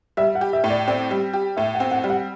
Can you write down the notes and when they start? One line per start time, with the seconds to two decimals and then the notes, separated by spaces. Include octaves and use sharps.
0.17 G3 E5
0.35 F#5
0.41 G4
0.53 E5
0.64 A2
0.70 D5
0.88 C4 D5
1.11 G3
1.34 G4
1.57 A2 E5
1.75 F#5
1.80 C4
1.91 F#5
2.04 G3
2.10 F#5